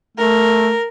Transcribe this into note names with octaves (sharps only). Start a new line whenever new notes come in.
A3 A#4